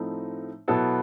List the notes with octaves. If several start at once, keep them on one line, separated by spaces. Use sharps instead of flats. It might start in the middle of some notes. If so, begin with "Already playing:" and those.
Already playing: A2 F3 A3 C4 D#4
B2 F#3 B3 E4 A4